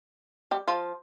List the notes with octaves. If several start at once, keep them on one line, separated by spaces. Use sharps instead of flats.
G3 G4
F3 F4